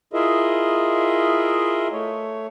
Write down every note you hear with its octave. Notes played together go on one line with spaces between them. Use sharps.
E4 F4 G#4 A#4 D#5 E5
A3 C#5